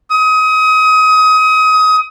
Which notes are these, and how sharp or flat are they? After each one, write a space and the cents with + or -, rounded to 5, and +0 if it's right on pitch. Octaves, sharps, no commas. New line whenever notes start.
D#6 +30